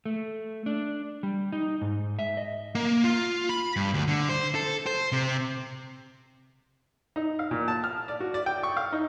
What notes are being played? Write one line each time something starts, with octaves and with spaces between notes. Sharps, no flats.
A3
D4
G3
D#4
G#2
E5
D#5
A#3
F4
B5
G2
D2
D3
C5
A4
C5
C3
D#4
F5
A#2
A5
F6
D5
F#4
D5
G5
C#6
F5
D#4